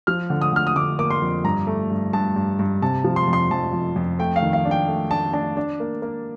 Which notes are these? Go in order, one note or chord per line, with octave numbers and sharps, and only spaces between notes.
F3 F6
D3
D#6
D3 F6
D#6
D3 D6
A#3 D6
C6
F2
G2 A#5
A3
G2
G2 A5
G2
G2
C3 A5
F3
C6
F2
C6
F2 A5
F2
F2
A3 G5
F5
D#3
F5
D4
G5
A3
D4 A5
D4 A5
D4
A#3
A#3